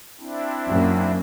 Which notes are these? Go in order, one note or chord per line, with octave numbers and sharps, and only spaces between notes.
C4 D4 E4
F#2 F#3 A#3